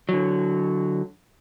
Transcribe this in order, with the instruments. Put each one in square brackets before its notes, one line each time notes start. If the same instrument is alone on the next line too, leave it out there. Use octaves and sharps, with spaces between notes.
[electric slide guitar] D3 F#3